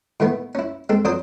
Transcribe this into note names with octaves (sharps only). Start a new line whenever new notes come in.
A2 D#3 A3 B3
C#4 E4
G#3 C4 A4
F2 F#3 D4 C5 D#6